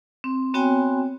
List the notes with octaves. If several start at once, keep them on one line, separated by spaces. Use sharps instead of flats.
C4
B3 C4 F#4 C#5 G5 G#5